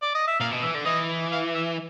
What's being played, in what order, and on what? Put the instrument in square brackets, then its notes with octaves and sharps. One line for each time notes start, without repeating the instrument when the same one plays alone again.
[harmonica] D5
D#5
E5
[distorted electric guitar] A#2 [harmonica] F5
[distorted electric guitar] B2
[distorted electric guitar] E3 [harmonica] E5
[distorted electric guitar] D3
[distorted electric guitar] E3 [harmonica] D#5
[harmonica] F5
E5